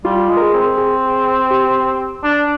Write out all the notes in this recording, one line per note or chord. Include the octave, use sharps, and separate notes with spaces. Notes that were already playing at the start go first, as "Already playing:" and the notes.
G3 F4
G#3
A#4
G#4
C4
G#4
G4
D4